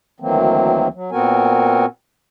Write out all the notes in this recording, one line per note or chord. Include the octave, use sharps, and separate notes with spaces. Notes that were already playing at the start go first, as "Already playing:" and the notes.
D2 D#3 E3 F#3 A#3 C4
F#3
A#2 B3 C4 F#4 A#4 G#5